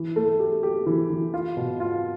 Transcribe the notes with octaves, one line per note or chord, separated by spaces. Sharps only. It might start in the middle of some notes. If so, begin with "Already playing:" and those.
Already playing: E3
A3
G4
G4
E3
E3
F4
B2
F4